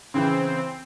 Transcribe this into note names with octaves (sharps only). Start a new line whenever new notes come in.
C#3 E3 C4